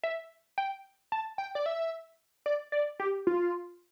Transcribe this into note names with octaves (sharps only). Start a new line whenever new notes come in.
E5
G5
A5
G5
D5
E5
D5
D5
G4
F4